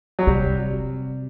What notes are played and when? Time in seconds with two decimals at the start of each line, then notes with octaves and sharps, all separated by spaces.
0.19 F#3
0.27 C3 G3